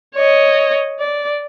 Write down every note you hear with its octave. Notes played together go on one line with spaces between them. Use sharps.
C#5 D#5
D5